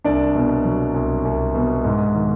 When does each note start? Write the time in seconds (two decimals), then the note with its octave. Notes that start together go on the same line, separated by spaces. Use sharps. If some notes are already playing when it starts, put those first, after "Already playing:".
0.04 C2 D4 D5
0.35 B2
0.64 F#3
0.94 C2
1.25 C2
1.55 B2
1.84 G#2
2.15 D#3